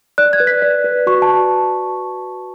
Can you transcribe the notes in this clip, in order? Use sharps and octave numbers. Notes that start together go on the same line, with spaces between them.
D5 F#6
G#6
B4
B6
D5
B4
F#4 C#6
A5